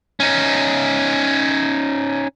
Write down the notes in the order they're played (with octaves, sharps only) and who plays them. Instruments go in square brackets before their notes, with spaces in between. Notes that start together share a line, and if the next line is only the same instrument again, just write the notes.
[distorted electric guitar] C#4 D#4